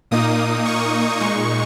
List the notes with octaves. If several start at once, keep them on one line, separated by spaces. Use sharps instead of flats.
A#2 A#3 D#4 D#6
C#6
A#2 G#3 D#4 C#6